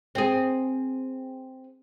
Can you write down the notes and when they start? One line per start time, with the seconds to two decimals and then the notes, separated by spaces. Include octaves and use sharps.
0.15 C4 G#4